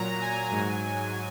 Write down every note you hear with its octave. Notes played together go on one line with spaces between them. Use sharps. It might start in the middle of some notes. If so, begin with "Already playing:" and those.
Already playing: A#2 F#3 A#5
G#5
G#2 F#3